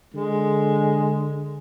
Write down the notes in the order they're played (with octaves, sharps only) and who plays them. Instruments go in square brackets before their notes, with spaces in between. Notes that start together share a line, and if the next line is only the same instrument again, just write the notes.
[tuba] D3 [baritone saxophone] G#3